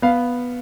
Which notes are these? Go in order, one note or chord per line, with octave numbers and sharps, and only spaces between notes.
B3 F5